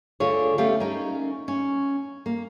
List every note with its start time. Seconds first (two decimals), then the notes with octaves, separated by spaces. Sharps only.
0.20 D2 D3 F4 G#4 C#5
0.58 A3 B3 C#4 G4 F5
0.80 C#4 D#4 A#4
1.48 C#4
2.26 A#3